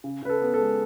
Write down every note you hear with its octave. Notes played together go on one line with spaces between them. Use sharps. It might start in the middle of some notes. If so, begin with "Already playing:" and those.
C#3
C#3 B4
A4
B3
A4
G#3